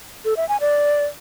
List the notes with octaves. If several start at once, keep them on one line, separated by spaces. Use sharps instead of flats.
A4
E5
G#5
D5